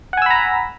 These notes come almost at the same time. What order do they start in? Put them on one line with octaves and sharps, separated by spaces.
F#5 G#5 E6 B5 A#5